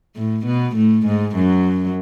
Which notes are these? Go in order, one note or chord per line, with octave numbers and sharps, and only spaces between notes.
A2 A3
B2 B3
A2 A3
G#2 G#3
F#2 F#3